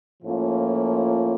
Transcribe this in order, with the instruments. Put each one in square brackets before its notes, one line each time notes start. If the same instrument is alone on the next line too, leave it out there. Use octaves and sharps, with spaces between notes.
[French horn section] A2 F3 A#3 C#4 F4